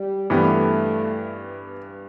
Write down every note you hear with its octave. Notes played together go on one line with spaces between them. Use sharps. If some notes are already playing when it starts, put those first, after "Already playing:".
Already playing: G3
G2 E3 A3 B3 G4